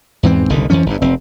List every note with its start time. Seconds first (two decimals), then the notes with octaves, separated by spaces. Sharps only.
0.23 E2 G#2 E3 C4
0.49 F#1 C2 D3 D#3
0.70 F2 E3 F3 C#4
0.86 G1 G2
1.02 F1 C4